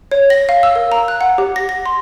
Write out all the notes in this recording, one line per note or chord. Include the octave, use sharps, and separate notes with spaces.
C#5
A#6
F5
E6
A#4
A#5
F#6
F#5
G4
A#6
A#6
C6